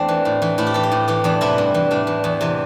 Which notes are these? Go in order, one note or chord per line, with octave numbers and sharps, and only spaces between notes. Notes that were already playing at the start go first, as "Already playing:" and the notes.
Already playing: E2 A3 C4 D4
E3
A2
E3
A2 E4
G4
E3 A4
G4
A2
E3 G4
E2 D4
C3 E3 E4
G2
E3
A2 D4
E3
E2
C3 E3